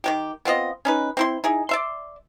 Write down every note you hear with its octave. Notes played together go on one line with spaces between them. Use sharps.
D#3 F#3 G4
B3 C4 F4 D#5
C#4 D#4 B4
C4 E4 C6
D#4 E4 G#4
D5 E5 C6